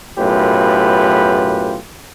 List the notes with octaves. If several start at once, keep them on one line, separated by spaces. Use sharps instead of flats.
B1 F#2 A2 F4 G4 B4